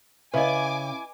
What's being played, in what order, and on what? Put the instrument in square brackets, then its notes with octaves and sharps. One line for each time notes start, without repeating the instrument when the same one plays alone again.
[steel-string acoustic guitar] C#3 [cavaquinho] E4 [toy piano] B4 D#5 [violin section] G#5 D6